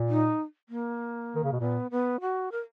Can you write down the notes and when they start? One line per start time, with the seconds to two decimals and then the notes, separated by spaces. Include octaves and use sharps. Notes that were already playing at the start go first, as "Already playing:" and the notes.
Already playing: A#2
0.09 D#4
0.69 A#3
1.35 D#3
1.44 C#3
1.52 B2
1.60 A#2 B3
1.91 B3
2.21 F#4
2.52 A#4